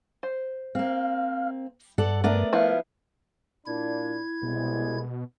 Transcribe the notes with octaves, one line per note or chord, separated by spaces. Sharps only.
C5
A#3 C4 F5
G2 A4 D5 F#5
A3 B3 D4 A#4 D5
F3 B3 E4 F5
A#2 D4 E4 G#6
C2 B2 G#3